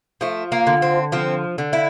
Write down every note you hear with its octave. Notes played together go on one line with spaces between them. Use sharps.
F3 A3
A#3
D3
C4
F3 C4
D3
E4